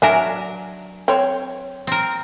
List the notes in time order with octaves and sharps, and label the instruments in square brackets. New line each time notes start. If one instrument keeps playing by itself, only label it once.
[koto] F#3 D4 A#4 [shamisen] E5 G#5
[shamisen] C4 C#5
[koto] C4 A#4